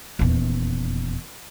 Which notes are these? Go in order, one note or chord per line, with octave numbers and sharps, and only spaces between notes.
D#1 E2